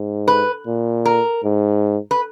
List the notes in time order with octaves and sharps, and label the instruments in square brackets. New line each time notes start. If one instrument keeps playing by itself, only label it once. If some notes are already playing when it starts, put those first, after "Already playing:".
Already playing: [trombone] G#2
[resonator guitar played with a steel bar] B4
[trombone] A#2
[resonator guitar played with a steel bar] A#4
[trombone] G#2
[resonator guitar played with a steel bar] B4